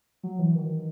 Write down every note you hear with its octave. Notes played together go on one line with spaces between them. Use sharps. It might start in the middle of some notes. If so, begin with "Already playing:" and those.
F#3
E3
D#3